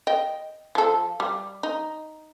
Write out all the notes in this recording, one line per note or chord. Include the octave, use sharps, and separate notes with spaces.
D#5 G5
F3 A4
G3
D#4